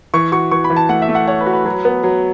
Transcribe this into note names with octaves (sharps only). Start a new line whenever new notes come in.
E3 C#6
F#4 C#6
E3 C#6
B5
E3
A5
A3 F#5
E5
A3
F#5
C#5 F#5
B4
F#4
B4
F#3
B3
F#3